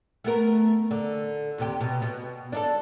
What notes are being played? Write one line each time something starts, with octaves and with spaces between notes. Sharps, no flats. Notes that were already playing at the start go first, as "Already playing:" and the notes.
A3 B3 A#4
D3
D#2 C3 G4
B2
B2
D4 D#4 A4